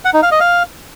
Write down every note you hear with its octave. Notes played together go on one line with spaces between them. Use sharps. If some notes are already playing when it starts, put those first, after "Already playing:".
F#5
D#4
F5
D#5
F5